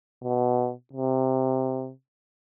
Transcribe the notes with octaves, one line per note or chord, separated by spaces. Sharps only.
B2
C3